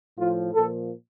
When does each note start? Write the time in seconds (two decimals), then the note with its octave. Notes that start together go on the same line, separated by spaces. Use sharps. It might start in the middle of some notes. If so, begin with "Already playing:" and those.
0.17 A2 F3 F4
0.53 A#2 F3 A4